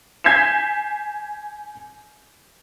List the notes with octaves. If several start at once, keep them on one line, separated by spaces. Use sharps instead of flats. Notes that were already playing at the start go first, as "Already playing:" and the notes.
G#5 G6 G#6 B6 C7 E7